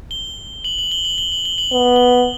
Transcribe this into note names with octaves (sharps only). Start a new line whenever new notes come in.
G7
F#7
F#7
G7
F#7
G7
F#7
G7
F#7
B3 G7
G7